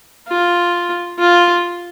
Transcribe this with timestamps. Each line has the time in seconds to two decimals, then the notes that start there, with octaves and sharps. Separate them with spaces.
0.27 F4
1.19 F4